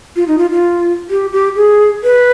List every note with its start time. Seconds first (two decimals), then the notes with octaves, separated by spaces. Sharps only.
0.16 F4
0.28 D#4
0.38 F4
0.51 F4
1.10 G4
1.32 G4
1.56 G#4
2.04 B4